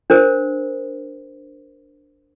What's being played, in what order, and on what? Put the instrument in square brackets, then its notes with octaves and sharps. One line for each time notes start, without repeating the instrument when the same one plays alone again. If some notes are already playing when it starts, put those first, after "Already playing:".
[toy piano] D4 A#4 C5